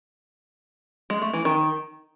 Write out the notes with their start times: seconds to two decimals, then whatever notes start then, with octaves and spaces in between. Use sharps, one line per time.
1.10 G#3
1.22 A3
1.33 E3
1.45 D#3